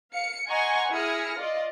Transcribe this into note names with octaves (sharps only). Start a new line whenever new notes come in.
F5 C#7
D#5 F#5 G#5 A#5 C6 C#6
E4 G#4 D#6 F6 A#6 C#7
F4 D5 D#5